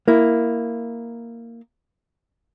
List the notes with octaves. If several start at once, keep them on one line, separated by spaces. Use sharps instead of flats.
A#3 E4